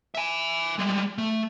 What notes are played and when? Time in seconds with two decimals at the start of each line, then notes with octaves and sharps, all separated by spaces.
0.15 E5 G#5
0.79 G3 G#3
1.18 A3